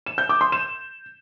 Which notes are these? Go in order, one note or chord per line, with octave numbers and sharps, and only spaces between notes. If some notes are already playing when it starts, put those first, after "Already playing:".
E7
G6
D6
C6
E7